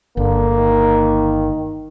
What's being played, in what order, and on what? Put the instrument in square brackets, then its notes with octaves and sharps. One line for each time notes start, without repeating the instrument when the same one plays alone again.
[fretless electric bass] G1 [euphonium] D3 [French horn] A#3
[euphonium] D#3